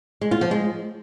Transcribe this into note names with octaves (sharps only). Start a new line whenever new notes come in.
G#3
F4
F3
G#3